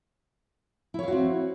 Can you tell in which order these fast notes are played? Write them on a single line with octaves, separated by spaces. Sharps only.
E4 C#5 F5 F#4 C4